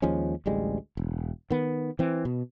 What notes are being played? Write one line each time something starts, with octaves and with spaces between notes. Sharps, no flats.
D#2 F3 G#3 C#4
A1 D2 G3 G#3
E1
D#3 B3
E3 C4
B2